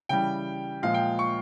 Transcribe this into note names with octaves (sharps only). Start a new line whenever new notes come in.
C#3 E3 G3 G5
A#2 F3 G#3 F5
G5
C#6